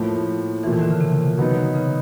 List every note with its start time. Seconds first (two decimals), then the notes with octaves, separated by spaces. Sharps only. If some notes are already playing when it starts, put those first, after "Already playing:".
Already playing: A2 F3 A#3
0.63 A#2 E3 F3 A3
0.73 D#3
0.82 D3
0.91 C#3
1.01 C3
1.38 F#3 B3 D#4
1.75 C#3